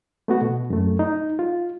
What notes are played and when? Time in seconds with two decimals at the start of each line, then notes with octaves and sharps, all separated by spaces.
0.28 A3 B3 F#4
0.42 B2
0.70 F#2 A3
0.99 D#4
1.39 F4